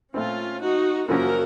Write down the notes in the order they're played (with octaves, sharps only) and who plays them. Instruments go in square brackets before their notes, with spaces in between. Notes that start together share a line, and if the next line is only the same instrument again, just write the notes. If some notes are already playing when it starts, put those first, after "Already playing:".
[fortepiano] A#2 A3 C4 [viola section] C#4 F4
[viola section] D#4 F#4
[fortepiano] F#2 C#3 F3 A#3 C#4 [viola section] F#4 A#4